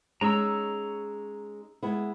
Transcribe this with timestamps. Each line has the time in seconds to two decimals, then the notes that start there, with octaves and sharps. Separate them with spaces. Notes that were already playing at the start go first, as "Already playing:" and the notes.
0.21 G#3 C#4 D#4 A#5 C#6 E6
1.83 G#3 B3 E4